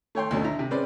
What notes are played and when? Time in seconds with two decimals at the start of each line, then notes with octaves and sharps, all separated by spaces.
0.15 A3 C#5 G5 C6
0.31 D2 B2 F#3 A3 C#4
0.43 D3 E4 A#5
0.59 C3
0.71 G#3 C4 C#4 B4 D5